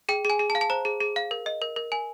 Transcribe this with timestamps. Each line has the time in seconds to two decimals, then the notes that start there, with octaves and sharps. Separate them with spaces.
0.09 G#4 G5
0.25 G#4 G#5
0.39 G#4
0.50 A5
0.55 F5
0.61 A5
0.70 C5 A#5
0.85 G#4
1.00 G#4
1.16 F5
1.31 A#4
1.46 D#5
1.62 A#4
1.76 A#4
1.92 A#4 G#5